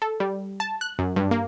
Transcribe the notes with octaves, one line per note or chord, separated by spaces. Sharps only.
A4
G3
A5
F#6
F#2
G2
A#3